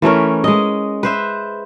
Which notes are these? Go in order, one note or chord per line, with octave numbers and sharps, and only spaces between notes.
E3 A3 C#4 A#4
G#3 D#5
B4 C5 E5